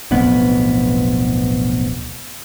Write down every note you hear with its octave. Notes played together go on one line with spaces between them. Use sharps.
D1 B1 F2 B3